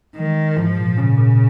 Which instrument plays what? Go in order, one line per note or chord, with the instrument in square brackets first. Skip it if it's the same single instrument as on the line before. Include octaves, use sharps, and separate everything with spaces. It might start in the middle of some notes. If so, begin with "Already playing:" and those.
[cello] D#3 [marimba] G#3
[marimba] G#2 [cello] F3
[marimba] A#2
[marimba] A#2 [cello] C#3
[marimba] A#2